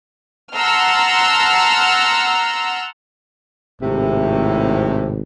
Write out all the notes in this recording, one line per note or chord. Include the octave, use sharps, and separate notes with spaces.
F#5 A5 A#5 C6 E6 F6
G#1 A2 C3